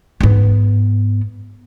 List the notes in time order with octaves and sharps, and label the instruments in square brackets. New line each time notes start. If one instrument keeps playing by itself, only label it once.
[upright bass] G#2 B3